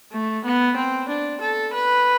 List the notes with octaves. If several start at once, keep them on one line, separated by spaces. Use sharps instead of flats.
A3
B3
C4
D4
A4
B4